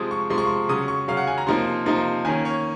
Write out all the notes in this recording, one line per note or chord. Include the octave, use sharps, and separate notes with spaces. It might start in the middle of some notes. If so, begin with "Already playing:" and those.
Already playing: C3 F3 G#3 D#6
C#6
C3 F3 G#3 C6
C#6
C6
C#3 F#3 C#4 D#6
C#6
C#3 F#3 C#4 F5
F#5
G#5
A#5
C3 F3 A#3 D#4 C6
C3 F3 A#3 D#4
D#3 A#3 C#4 G#5
C#5